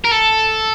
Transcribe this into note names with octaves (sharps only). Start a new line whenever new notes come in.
A#4
A4